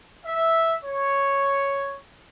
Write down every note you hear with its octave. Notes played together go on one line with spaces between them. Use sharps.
E5
C#5